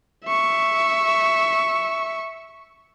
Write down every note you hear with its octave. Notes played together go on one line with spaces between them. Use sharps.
E5 C#6